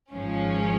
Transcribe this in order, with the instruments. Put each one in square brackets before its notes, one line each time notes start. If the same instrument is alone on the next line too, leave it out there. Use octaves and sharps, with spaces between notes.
[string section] G#1 G#2 F3 G#3 C#4